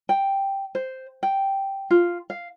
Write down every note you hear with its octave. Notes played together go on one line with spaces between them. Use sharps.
G5
C5
G5
F4
F5